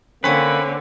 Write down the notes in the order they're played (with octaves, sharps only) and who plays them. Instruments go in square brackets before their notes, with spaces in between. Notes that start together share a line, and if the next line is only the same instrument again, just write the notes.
[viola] D3 [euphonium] A#3 [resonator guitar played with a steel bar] C4 C#4 [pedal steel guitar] B4